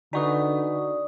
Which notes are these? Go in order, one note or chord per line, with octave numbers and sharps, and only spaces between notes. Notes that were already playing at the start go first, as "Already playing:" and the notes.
D3 D#4 F#4 B4 D5 C#6 D#6